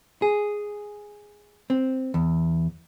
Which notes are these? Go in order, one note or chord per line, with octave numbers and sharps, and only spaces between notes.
G#4
C4
E2